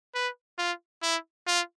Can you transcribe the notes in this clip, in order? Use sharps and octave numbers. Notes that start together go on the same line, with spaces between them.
B4
F4
E4
F4